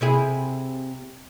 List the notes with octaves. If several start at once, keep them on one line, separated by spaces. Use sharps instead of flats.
C3 E4 G#4